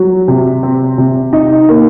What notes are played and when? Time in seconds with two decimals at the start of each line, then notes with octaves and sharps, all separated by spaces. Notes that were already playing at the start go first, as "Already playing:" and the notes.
Already playing: F#3
0.28 C3
0.63 C4
0.98 C3
1.33 D#4
1.69 A#3